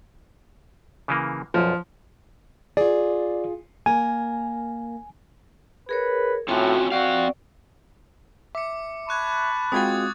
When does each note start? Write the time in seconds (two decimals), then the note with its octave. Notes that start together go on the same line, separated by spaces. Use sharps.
1.08 C#3 E3 A#3
1.54 B1 F#2 F3
2.77 F4 G#4 D5
3.86 A#3 A#4 G#5
5.89 G#4 A#4 B4 C#5
6.48 A2 C4 C#4 F4 F#4 G#5
6.92 C4 F#4 D5 F5
8.55 E5 D6 C#7
9.09 A5 B5 C#6 F#6 G#6
9.72 G#3 C4 F4 F#4 G5 D#6 G#6 A6